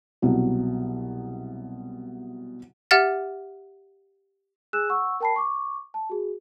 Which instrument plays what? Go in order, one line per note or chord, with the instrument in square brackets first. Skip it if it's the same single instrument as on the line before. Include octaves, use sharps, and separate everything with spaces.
[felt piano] C2 B2 F#3
[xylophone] G4 E5 F#5 F6 A6
[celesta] G#4 G#5 E6 F#6 E7
F#5 C#6 E6
A#4 G5 A5 B5 C7
C#6 D6
A5
F#4 G#4